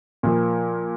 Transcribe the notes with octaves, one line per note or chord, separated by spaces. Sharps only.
A#2 F3 A#3